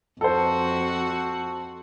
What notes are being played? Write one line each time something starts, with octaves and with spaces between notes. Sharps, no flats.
F2 F#4 A4 C5